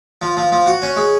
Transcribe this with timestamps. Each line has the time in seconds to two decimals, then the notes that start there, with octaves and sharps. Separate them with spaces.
0.22 F3
0.37 F3
0.52 F3
0.66 F#4
0.82 C#4
0.97 G#3